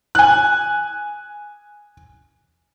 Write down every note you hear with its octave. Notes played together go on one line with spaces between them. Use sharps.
G#5 F#6